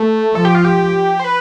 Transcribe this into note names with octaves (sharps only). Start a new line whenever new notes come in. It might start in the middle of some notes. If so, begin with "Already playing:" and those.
Already playing: A3
F3 A4
G4
F4
G4
C5
B4